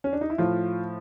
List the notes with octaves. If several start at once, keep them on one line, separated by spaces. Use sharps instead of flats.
C#4
D4
D#4
E4
A2 F3 F4